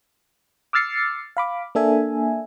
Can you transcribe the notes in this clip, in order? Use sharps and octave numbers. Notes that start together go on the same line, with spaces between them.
D6 E6 F6 A6 C7 C#7
F5 B5 D6
A#3 D4 A4 E5 G#5